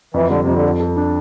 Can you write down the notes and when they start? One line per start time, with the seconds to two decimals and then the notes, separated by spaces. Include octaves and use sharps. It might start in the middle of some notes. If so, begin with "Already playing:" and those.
0.14 F2 E3
0.27 D3 G3
0.41 C3
0.47 F2
0.53 D3
0.63 A4
0.80 A4
0.96 D4